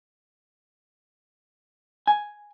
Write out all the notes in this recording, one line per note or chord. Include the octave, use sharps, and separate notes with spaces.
G#5